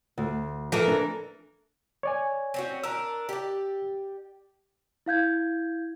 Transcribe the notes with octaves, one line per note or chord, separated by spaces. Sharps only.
D2
E3 F3 A4 A#4
D4
C#5 D5 G#5
C4 C#4 F#4
D4 A#4 E6
G4 D5
E4 F5 G6 G#6